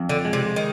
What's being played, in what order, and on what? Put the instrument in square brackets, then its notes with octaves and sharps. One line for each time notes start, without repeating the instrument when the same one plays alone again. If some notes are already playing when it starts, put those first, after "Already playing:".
Already playing: [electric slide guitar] F2
[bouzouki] D3
[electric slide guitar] G#3
[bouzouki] C3
D#3